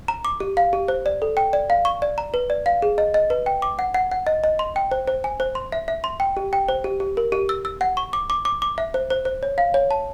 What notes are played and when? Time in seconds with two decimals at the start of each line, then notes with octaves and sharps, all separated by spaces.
0.08 A#5
0.25 D6
0.40 G4
0.57 F5
0.73 G4
0.88 C5
1.06 D5
1.22 A4
1.37 G5
1.53 D5
1.70 F5
1.85 C#6
2.02 D5
2.18 A#5
2.34 B4
2.50 D5
2.66 F5
2.82 G#4
2.98 D#5
3.14 D#5
3.30 B4
3.46 G5
3.62 D6
3.79 F#5
3.94 F#5
4.11 F#5
4.27 D#5
4.44 D#5
4.59 C6
4.76 G5
4.91 C5
5.07 C5
5.24 G#5
5.40 C5
5.55 C6
5.72 E5
5.88 E5
6.04 C6
6.20 G5
6.37 G4
6.53 G5
6.69 C5
6.84 G4
7.00 G4
7.17 A#4
7.32 G4
7.49 E6
7.65 E6
7.81 F#5
7.97 C#6
8.13 D6
8.30 D6
8.45 D6
8.62 D6
8.78 E5
8.94 C5
9.10 C5
9.25 C5
9.43 C#5
9.58 F5
9.74 C#5
9.91 A5